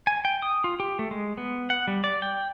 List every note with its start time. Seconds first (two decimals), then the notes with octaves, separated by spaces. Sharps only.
0.07 G#5
0.25 G5
0.42 D#6
0.64 F4
0.80 G4
0.99 A3
1.11 G#3
1.37 B3
1.70 F#5
1.87 G3
2.04 D5
2.22 G5